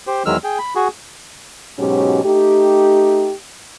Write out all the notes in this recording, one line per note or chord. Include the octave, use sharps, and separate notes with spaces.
G4 C5
E2 D#3 F#3 G#3 E6 F6
G#4 G5
B5
F#4 G#4
G#2 B2 F#3 C#4 G4
A3 D#4 G4